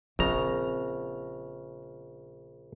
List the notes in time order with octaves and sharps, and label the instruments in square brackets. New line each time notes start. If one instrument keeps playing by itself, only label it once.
[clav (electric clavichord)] A#1 C#3 A#5 [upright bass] C4